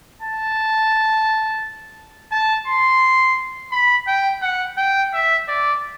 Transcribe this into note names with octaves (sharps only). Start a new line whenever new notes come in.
A5
A5
C6
B5
G5
F#5
G5
E5
D5